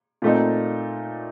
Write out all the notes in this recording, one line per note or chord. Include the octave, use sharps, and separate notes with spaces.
A#2 A3 C4 D#4